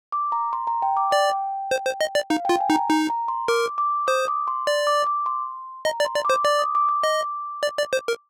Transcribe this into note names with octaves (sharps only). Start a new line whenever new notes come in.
D6
A#5
C6
A#5
G5
D6
D5 G5
C5
C5
D#5
D5
D#4 F5
F4 G5
G#5
D#4
A#5
D#4
A#5
C6
A#4 D6
D6
C5 D#6
D6
C6
D5
D6
D6
C6
D#5 A#5
D5
C6
D5
C5 D6
D5 D6
D#6
D6
D6
D#5
D5
D5
C5
A#4